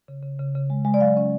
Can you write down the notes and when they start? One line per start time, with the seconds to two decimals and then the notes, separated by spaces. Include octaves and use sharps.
0.08 C#3
0.23 C#3
0.39 C#3
0.55 C#3
0.70 G#3
0.85 G#3
0.94 D5
1.01 F#3 F5
1.17 C#4